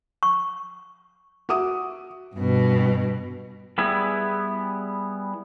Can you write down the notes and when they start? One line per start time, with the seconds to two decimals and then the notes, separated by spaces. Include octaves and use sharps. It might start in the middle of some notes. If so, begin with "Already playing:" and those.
0.23 C#6
1.49 F#4 E5 D6 D#6
2.35 G2 B2
3.78 G3 B3 E4 G#4